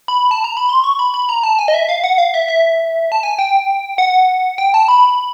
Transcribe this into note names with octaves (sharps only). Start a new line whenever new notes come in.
B5
A5
A#5
B5
C6
C#6
B5
B5
A#5
A5
G#5
D#5
E5
F5
F#5
F5
E5
E5
A5
G#5
G5
F#5
G5
A5
B5